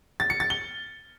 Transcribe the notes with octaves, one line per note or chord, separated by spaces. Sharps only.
A6
C#7
A6
G7